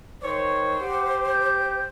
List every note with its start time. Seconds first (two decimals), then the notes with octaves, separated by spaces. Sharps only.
0.22 D#3 C5 C#5
0.81 G4 F#5
1.29 G6